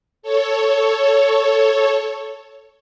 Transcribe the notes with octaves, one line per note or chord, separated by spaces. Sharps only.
A4 C#5